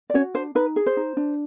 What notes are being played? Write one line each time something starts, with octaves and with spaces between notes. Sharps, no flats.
D5
C#4 F#4 C#5
D4 C5
D#4 B4
G#4
C5
D#4
D4